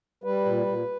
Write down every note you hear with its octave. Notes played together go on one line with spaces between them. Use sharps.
G3 B4
A#2
A#2